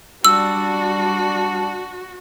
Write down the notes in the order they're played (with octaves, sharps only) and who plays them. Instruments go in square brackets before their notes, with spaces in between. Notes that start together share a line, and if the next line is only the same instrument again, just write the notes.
[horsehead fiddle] G3 D4 [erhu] F#4 [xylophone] E6